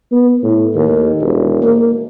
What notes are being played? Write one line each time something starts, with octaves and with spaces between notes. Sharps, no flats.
B3
A2
D#2
E1
A#3